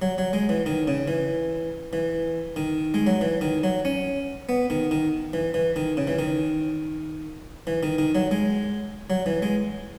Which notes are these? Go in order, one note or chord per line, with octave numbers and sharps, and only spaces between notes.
F#3
F#3
G#3
E3
D#3
C#3
E3
E3
D#3
G#3
F#3
E3
D#3
F#3
C#4
B3
D#3
D#3
E3
E3
D#3
C#3
E3
D#3
E3
D#3
D#3
F#3
G#3
F#3
E3
G#3